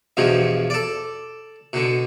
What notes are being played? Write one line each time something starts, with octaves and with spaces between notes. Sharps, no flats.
E2 G2 B2 F3
A4 D5
B2 D3